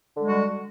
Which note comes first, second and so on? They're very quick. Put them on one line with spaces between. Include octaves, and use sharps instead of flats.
D3 G#3 G3 F#4